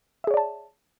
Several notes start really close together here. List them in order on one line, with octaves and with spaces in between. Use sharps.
E5 G#4 C#5 D5 A5